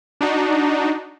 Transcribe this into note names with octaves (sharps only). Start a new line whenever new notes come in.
D4 D#4 F#4